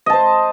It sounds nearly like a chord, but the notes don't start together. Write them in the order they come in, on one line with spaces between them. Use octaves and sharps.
D#5 A5 C5